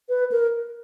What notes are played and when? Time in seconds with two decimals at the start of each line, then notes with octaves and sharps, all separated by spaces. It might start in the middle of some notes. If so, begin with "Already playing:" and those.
0.09 B4
0.32 A#4